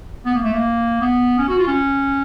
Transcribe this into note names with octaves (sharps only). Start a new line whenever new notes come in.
B3
A#3
A3
A#3
B3
C#4
F#4
F4
C#4